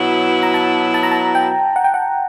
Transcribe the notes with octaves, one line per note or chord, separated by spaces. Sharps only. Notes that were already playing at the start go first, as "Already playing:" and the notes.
Already playing: B2 F#3 B3 E4
A#5
A5
A5
A#5
A5
G5
F#5
G5
F#5